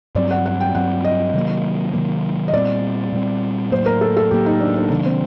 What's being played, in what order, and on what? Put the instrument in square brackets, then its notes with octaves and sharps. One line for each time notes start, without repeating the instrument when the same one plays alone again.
[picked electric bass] G2 F#3 C4 [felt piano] D5
[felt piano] F#5
F#5
G5
[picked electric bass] G2 F#3 C4 [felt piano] F#5
[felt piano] D#5
[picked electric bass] C3 D#3 F#3 A#3
C3 D#3 F#3 A#3
[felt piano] D#5
[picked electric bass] A#2 G3 C4 [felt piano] D5
[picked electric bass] A#2 G3 C4
[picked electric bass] A2 F#3 A#3 [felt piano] C5
[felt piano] A#4
A4
A4
[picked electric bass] A2 F#3 A#3 [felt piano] G4
[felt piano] D#4
D4
D4
[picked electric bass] C3 D#3 F#3 A#3 [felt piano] D4
[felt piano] C4